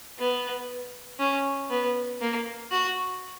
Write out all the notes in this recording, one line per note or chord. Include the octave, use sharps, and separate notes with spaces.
B3
C#4
B3
A#3
F#4